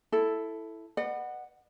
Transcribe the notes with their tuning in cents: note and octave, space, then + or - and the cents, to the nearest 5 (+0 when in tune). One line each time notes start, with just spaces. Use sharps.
E4 +0 A4 +0
B4 +0 D#5 -45 F#5 +0